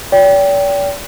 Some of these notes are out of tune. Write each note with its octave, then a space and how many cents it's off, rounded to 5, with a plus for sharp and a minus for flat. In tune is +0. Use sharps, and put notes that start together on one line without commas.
D5 -45 G5 +0